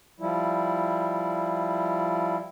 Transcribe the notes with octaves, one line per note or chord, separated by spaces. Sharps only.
F3 G3 E4